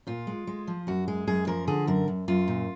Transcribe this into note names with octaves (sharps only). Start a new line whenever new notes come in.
A#2 F4
G#3
G#3
F3
F#2 F#4
G#3 G#4
F#2 G#4
F3 A#4
D3 G#4
F#2 A#4
F#2
F#2 F4
A#2